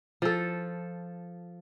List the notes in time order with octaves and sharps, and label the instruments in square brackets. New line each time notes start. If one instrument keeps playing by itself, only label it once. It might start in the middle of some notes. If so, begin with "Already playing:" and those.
[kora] F3 A4